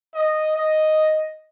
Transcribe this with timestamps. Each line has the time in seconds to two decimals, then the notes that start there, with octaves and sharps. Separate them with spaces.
0.15 D#5
0.56 D#5